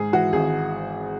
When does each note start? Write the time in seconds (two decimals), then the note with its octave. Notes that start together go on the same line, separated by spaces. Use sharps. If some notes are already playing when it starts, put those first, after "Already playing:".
Already playing: G#2 G#4
0.13 E3 F#4
0.33 G#1 G#4